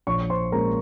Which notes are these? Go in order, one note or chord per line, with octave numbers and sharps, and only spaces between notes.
A#1 C#5 C#6
C5 C6
A#2 G#3 C#4 A#4 A#5